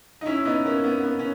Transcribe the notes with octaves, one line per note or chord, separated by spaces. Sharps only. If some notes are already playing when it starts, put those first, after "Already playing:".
D#4
C#4 E4
B3 D#4
A#3 C#4
B3
B3
C#4